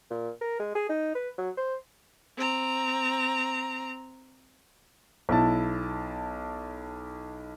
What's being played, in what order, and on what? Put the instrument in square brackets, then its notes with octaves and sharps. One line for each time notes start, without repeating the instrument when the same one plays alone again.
[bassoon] A#2
A#4
G#3
G#4
D#4
B4
F#3
C5
[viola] C4 A#5
[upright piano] B1 E4 A5